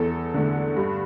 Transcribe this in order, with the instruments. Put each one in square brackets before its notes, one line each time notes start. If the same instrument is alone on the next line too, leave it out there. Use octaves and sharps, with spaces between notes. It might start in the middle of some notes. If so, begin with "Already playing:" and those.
Already playing: [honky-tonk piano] E2 A4
D3 A3
G2